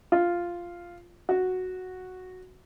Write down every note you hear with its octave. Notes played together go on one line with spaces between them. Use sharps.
F4
F#4